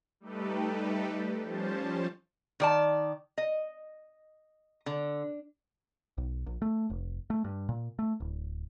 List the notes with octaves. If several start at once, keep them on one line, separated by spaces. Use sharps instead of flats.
G3 A3 D#4 G4 A4 B4
F3 G3 C#4 C5 A5
D#3 D5 A5
D#5
D3
B1
A#1
A3
F1
A3
G2
A#2
A3
D1